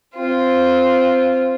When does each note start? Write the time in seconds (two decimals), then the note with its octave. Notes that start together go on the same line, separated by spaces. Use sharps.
0.15 C4 F4